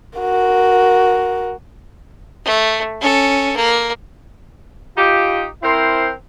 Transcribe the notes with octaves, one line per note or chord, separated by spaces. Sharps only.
F#4 A#4
A3
C#4 A4
A#3
D#4 F4 G4
C4 E4 A#4 C5